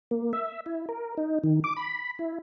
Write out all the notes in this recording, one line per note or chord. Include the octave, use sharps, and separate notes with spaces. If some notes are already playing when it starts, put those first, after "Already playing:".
A#3
E5
E4
A#4
D#4
D#3
D6
B5
B5
E4